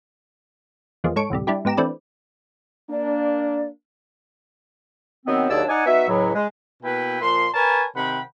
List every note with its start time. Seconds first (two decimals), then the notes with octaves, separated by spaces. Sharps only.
1.04 E2 F3 G#3 A#3
1.16 G#2 A4 C#5 C#6 D7
1.30 A1 D2 C3 G3
1.47 G3 D4 E4 G4
1.65 G#2 B3 G4 A#5 E7
1.77 E3 A3 C4 D4 B4 D5
2.90 A#3 D4 D5
5.26 D#3 F#3 B3 C4
5.50 D#2 F#3 D4 G#4 D5 E6
5.69 D#4 D5 F#5 G#5
5.86 B3 D#4 F#4 E5
6.09 C#2 A2 F#3
6.35 G#3
6.83 B2 A#3 E4 B4 G5
7.21 A#2 F3 C6
7.54 A#4 B4 C#5 G#5 A5
7.95 C3 D#3 F#5 G5 B5